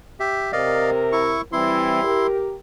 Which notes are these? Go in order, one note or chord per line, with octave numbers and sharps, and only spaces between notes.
G4 E5
C3 A#4 D5 D#5 F5
E4 C#6
E3 G3 C4 E4 C6
G4 A#4